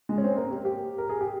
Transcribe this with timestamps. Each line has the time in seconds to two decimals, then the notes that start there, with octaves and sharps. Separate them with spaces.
0.09 G#3
0.18 C#4
0.24 C4
0.37 A#3
0.51 G4
0.65 G4
0.98 A#4
1.09 G#4
1.21 G4